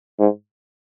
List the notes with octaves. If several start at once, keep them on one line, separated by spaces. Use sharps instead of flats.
G#2